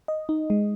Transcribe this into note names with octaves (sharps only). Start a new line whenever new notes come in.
D#5
D#4
G#3